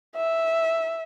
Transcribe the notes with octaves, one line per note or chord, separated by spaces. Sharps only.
E5